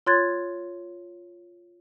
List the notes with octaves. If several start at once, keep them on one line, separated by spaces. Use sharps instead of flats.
F4 C#5 C6 F#6 G#6 A6